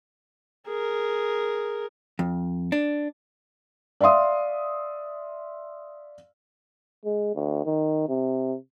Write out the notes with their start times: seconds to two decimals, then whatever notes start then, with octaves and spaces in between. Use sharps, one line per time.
0.67 G#4 A#4
2.19 F2
2.72 D4
4.01 D5 E5 F5 C6 D#6
7.05 G#3
7.35 D2
7.65 D#3
8.08 C3